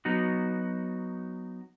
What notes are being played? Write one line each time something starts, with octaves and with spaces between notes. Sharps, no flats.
F#3 B3 D#4 F#4